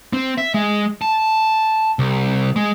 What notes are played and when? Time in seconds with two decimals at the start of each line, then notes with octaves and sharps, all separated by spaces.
0.13 C4
0.38 E5
0.54 G#3
1.02 A5
1.99 C2
2.56 G#3